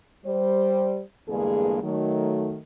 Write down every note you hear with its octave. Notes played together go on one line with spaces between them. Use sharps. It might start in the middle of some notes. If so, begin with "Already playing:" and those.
G3 C5
E2 G2 D3 G#3 A#3 G#4
D#3 F#3 A3